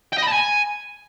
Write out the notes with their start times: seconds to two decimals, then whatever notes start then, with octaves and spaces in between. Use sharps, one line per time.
0.13 G5
0.18 D#5
0.23 B5
0.28 A5
0.33 G#5